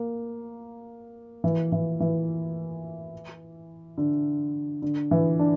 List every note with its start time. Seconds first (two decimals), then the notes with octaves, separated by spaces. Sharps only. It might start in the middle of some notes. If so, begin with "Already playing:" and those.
Already playing: A#3
1.44 E3
1.72 E3
2.00 E3
3.98 D3
4.82 D3
5.11 E3
5.39 D4